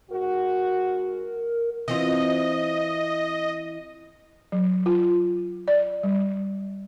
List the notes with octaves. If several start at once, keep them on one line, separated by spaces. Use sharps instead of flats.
G#2 F#4 A#4
E3 C4 F4 D#5
F#3
F4
D5
G3